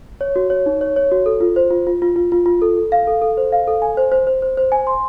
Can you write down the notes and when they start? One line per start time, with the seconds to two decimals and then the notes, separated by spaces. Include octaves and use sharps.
0.21 C#5
0.36 F#4
0.50 C#5
0.66 D#4
0.81 C#5
0.96 C#5
1.11 F#4
1.26 A4
1.41 F4
1.56 C5
1.71 F4
1.87 F4
2.02 F4
2.16 F4
2.32 F4
2.46 F4
2.62 A4
2.77 A4
2.92 F5
3.07 A4
3.22 A4
3.37 C5
3.52 F5
3.68 A4
3.82 G#5
3.97 C5
4.12 C5
4.27 C5
4.42 C5
4.58 C5
4.72 G#5
4.87 C6